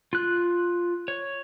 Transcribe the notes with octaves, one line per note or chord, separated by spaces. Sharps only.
F4 F#6
C#5